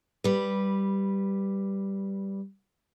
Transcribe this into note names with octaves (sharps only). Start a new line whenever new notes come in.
G3 B4